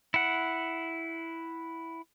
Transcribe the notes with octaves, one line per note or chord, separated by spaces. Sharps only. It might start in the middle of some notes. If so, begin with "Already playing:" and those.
E4 F#5